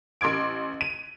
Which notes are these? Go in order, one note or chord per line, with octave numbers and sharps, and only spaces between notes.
A1 C6 D6 G#6 D7
D#7